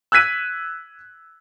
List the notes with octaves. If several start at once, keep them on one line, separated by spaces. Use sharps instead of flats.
E6 F#6 G#6 B6 D#7